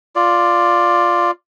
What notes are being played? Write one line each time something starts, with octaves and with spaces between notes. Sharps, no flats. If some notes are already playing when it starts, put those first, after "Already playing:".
F4 D5